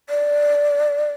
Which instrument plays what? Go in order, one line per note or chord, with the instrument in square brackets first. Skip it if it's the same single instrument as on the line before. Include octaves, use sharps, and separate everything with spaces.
[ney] D5